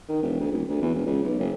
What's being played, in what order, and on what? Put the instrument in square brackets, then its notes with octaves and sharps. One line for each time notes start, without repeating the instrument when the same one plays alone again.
[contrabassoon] D#3
E1
D2
D#1
D2
E2
E1
C#2
B1
F#1